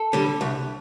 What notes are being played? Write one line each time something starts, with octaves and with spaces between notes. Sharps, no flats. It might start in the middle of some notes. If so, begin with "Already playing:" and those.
Already playing: A4
D3 G3
C2